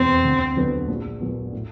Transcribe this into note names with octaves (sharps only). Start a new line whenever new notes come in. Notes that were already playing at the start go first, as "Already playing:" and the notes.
Already playing: F1 E2 B2 C4
D2
D3 F#3 B3
A#1
A#2 F#3 B3
A2